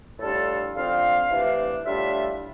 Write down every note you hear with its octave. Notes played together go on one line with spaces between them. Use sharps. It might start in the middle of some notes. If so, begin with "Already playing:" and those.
A2 G3 D4 F4 A4
D3 F3 C4 F4 F5
C3 E3 A3 D4
A2 G3 D4 F4 E5